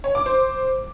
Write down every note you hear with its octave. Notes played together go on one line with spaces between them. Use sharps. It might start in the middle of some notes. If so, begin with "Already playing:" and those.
C#5
D6
C5